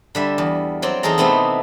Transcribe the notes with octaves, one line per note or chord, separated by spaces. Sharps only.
D3 G3 E5
E2
F#3 C4 D5
E2 D#4 G#4 A4 A#5
C3 A3 B3 C4 D#4 E4